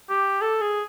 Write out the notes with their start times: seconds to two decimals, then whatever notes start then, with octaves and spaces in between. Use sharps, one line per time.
0.09 G4
0.41 A4
0.61 G#4